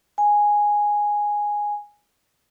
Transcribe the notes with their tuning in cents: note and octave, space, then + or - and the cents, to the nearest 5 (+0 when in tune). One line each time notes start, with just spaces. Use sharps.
G#5 -5